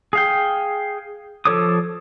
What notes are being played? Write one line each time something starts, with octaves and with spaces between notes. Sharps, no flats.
G#4 F5 G5
F3 A4 C#5 D6 D#6